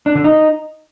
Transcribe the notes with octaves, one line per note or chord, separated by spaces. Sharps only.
D4
D3
D#4